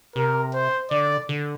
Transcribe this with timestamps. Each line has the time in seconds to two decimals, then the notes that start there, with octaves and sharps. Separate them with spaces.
0.16 C3 A#4
0.54 C5
0.91 D3 D5
1.29 D3